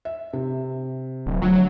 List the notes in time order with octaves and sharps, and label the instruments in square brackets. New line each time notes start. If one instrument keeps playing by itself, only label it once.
[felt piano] E5
C3
[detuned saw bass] D1
[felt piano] D2 [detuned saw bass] F#3